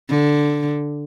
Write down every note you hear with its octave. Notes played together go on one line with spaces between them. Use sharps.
D3